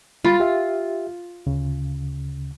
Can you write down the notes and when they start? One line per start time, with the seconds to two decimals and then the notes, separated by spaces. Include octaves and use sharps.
0.24 G3 F4 B5 A6
0.40 G4 E5
1.47 D2 C#3